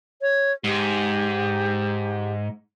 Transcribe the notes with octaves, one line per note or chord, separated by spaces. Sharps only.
C#5
G#2 G4